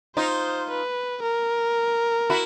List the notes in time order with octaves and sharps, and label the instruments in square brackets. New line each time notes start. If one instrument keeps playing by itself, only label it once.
[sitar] D#4 F4 [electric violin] C5
[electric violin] B4
A#4
[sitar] E4 F#4